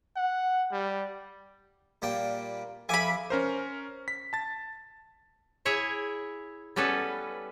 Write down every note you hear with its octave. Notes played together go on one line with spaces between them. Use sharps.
F#5
G3
A#2 G3 G5
F2 E5 G#5 B5 D6
C#4 A#4 C5
B6
A5 A6
E4 G#4 C#5 E5
G3 B3 C#4 A4 B4